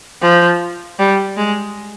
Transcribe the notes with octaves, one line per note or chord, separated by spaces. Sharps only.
F3
G3
G#3